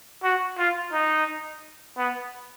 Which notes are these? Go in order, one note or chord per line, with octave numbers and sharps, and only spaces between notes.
F#4
F4
D#4
B3